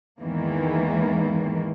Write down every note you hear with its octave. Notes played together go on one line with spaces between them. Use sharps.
E2 G#2 D#3 E3 A#3